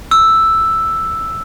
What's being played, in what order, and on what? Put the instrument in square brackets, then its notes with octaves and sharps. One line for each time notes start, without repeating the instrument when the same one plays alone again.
[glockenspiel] E6